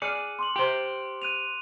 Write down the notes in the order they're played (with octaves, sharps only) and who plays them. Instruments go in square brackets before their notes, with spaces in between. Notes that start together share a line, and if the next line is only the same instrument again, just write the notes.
[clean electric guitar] G#4 D5 [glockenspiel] F6 F#6 C#7
[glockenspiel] C6 D6 F#7
[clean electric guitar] G4 C5
[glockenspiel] F#6 D#7 F7